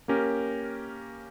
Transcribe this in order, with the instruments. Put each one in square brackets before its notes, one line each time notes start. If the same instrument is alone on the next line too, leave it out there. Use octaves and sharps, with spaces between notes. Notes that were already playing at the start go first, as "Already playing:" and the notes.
[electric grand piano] A#3 C#4 G4 A#4